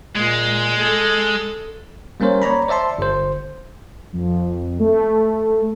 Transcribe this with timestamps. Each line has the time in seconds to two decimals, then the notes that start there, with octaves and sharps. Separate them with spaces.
0.15 A#2 G#3
0.79 A4
2.20 G3 A#3 C#4 A#4 C5 C#5
2.42 C#5 D5 A#5 B5
2.68 C5 D5 E5 A5 C6
2.98 G1 C5
4.13 F2
4.79 A3